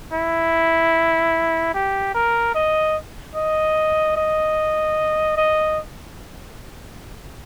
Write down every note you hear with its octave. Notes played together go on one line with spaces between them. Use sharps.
E4
G4
A#4
D#5
D#5
D#5
D#5